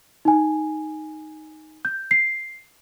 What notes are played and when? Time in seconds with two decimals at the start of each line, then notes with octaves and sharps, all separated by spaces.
0.25 D#4 G#5
1.85 G6
2.11 C7